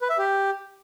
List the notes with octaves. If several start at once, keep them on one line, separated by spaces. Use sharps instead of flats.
B4
E5
G4